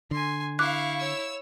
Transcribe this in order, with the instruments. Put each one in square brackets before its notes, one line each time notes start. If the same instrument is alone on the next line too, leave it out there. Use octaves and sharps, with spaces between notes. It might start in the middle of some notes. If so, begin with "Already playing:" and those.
[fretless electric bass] D3 [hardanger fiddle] G#5 C6
[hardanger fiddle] E4 C#6 [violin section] F5 [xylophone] D6 F#6
[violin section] C#5 E6